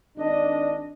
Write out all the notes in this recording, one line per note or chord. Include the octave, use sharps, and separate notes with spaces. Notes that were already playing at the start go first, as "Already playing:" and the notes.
G#1 D4 D#5